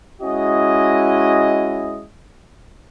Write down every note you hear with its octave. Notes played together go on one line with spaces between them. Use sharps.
G#3 C#4 E4 F#4 D#5